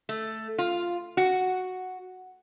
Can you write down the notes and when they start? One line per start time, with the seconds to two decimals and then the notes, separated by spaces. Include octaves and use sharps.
0.09 A3
0.58 F4
1.17 F#4